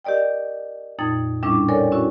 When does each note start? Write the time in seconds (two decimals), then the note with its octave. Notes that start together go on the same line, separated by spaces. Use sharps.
0.04 G4 A#4 D5 D#5 G5
0.99 F2 A#2 D#4 G5 A6
1.43 A2 G3 C#4 D4 E4 D6
1.69 A4 A#4 C#5 D5 G5 G#5
1.92 C#4 E4 F#4